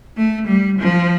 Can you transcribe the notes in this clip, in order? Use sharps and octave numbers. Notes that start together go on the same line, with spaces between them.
A3
G3
F3